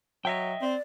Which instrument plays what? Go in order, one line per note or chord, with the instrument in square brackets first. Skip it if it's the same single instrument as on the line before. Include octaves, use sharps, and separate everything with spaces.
[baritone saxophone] F#3 [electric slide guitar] D#5 E5 G5
[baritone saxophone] C4 [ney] D5